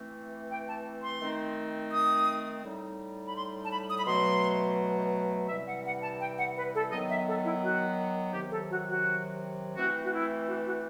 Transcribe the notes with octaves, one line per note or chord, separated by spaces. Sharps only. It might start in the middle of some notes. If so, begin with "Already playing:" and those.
Already playing: E3 A3 C4
G5
A5
C6
D#3 A3 C4 D#4
D#6
A2 G3 D#4
B5
C6
A5
B5
D#6
B5
B2 F#3 A3 C6
C3 E3 G3 C4 E5
F#5
F#5
A5
G5
F#5
B4
A4
D#3 F#3 B3 D#5
E5
A4
E4
F#4
C3 D#3 F#3 G4
A4
F#4
F#4
E3 A3 C4 F#4
F#4
E4
F#4
F#4